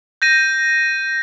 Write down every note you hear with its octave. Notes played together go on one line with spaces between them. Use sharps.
G6 A#6 D#7